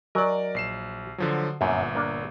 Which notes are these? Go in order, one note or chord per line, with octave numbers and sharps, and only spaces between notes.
F#3 A#4 D5 D#5 G#5
A#1 C7 E7
D3 F3 F#3
G1 F#2 A#2 E5
A#3 D4